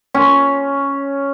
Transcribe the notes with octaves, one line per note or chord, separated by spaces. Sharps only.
C#4